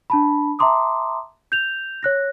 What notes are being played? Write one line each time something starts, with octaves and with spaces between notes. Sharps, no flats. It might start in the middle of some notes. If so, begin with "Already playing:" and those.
D4 A5 B5
E5 A5 A#5 C6 D6 D#6
G6 F7
C#5 F#6 A#6